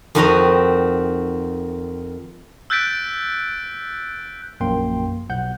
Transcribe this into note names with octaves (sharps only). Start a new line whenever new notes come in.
F2 D#3 C4 F#4 D#5 A#5
E6 F#6 G6 A6 B6 D7
A#1 F#2 A#3 G5 C6
B1 F#5 G6